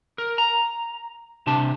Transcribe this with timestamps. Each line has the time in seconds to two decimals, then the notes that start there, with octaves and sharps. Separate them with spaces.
0.18 A#4
0.38 A#5
1.47 C3 D4 G4 A5